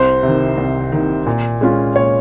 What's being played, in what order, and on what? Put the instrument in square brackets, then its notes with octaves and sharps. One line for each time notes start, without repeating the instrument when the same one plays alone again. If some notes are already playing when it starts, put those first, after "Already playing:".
Already playing: [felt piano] C2 [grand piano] C5
[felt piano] C3 D#3
C2
C3 D#3
A#2
G#3 C#4 F4
[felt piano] A#2 [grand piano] C#5